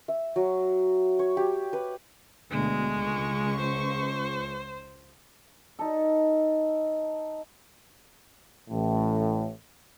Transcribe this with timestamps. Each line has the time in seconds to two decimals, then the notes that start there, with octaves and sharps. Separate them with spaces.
0.08 E5
0.36 F#3
1.19 C#5
1.37 G4
1.73 B4
2.51 D2 B2 G#3
2.91 C#2 C#6
3.60 C5
5.79 D#4 A4
8.70 A1 A2